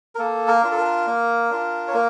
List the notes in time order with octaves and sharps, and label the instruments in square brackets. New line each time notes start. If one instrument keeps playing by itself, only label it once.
[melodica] A#4
A#3 A4
A#4
D4 F4
A4
A#4
A#3
D4 F4
C#5
A#3 A#4